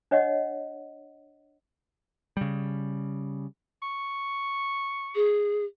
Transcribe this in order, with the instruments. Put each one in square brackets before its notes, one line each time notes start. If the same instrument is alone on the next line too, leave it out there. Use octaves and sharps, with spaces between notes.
[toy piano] D4 C#5 D#5 F#5
[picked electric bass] C#3 G3
[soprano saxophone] C#6
[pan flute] G#4